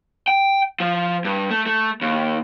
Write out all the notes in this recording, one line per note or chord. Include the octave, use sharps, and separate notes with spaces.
G5
F3
G2
A3
A3
D#2